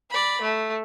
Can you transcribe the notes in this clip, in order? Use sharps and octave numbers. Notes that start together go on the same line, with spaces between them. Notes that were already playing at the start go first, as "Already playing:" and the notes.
D5 B5
A3